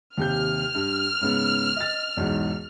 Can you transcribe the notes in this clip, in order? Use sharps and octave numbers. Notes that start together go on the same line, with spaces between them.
D#2 C3 F6 G6
G2
G#2 C#3 B3
D#5 A6
B1 E2 G#2